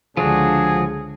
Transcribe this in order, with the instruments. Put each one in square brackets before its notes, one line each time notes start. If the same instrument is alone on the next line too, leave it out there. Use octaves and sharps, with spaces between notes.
[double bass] C#2 D3 [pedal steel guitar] F3 D4 F#4 [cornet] G#4